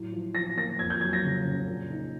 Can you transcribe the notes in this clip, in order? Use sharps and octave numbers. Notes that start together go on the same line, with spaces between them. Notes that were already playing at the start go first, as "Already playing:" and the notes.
Already playing: A2 F#3
F3
F3 A#6
A#3 A#6
F2 G#6
G6
F#3 G#6
A#6
C#3
C#3
A#2
D#4